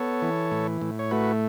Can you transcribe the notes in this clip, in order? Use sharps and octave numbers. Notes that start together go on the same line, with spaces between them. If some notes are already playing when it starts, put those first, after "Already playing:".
Already playing: B3 A4 C#5
E3
A2
A2
C#5
A3 F#4 B4